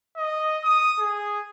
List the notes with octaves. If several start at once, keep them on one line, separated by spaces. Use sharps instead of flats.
D#5
D#6
G#4